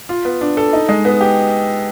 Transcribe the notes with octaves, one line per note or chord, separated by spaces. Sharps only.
F4
B3
D4
A4
D#4
G#3
B3
G4